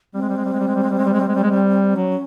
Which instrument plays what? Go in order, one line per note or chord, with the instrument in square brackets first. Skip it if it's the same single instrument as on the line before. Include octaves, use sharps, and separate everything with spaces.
[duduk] G3 [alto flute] C4
[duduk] G#3
G3
G#3
G3
G#3
G3
G#3
G3
G#3
G3
G#3
G3
G#3
G3
G#3
G3
G#3
G3
[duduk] F#3 [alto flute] C#4